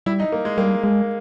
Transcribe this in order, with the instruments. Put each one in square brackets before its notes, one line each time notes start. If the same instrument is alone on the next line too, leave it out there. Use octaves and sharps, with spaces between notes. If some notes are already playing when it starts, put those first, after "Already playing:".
[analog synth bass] G3 [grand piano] E4
[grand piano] D#4
A#3
G#3
[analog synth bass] G3 [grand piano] A#3
[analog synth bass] G#3 [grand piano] A#3